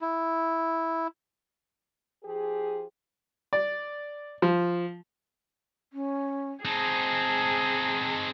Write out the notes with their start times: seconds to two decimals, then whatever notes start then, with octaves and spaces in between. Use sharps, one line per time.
0.01 E4
2.23 F3 G4 G#4
3.53 D5
4.42 F3
5.93 C#4
6.65 C4 D#4 G#4 A5